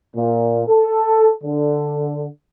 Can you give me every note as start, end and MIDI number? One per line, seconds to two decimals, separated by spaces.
0.15 0.64 46
0.68 1.31 69
1.44 2.26 50